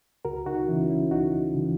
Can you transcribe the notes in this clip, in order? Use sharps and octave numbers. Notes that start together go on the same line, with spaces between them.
C#2 F#4 A#4
D#4 F#4
C#3 E3 C#4 E4
C#4 E4
C#2 D#4 F#4
C#3 E3